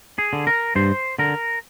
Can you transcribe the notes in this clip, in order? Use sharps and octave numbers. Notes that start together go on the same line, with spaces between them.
G#4
D3
A#4
G2 C5
D3 A#4